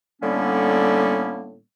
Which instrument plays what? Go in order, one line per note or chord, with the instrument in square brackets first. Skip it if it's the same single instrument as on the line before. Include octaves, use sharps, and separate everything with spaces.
[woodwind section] A2 D3 G3 A#3 B3 C#4